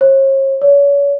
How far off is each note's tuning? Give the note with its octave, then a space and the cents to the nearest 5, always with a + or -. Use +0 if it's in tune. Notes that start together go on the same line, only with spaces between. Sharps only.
C#5 -45
C#5 +35